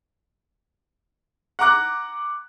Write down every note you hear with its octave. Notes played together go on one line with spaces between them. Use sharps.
F#5 A#5 D6 F#6